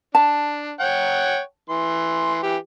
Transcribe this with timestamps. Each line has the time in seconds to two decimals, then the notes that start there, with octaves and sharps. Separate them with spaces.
0.15 D4 A5
0.80 C#5 F#5 G5
1.69 E3 C6
2.43 E3 G4